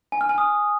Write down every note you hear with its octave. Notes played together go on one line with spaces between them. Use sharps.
G#5
F6
G#5
D#6